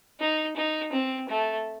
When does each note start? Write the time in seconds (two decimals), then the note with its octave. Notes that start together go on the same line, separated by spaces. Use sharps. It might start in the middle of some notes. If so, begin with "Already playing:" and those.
0.20 D#4
0.57 D#4
0.93 C4
1.29 A3